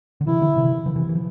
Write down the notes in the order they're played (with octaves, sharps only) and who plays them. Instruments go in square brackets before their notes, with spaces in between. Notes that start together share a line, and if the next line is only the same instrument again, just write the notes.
[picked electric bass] D3
[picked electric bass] C3 E3 [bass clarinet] E4
[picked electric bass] D3 F3
C3 E3
D3 F3
C3 E3
E3
F3